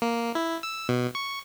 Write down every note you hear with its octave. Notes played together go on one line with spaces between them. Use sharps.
A#3
E4
E6
B2
C#6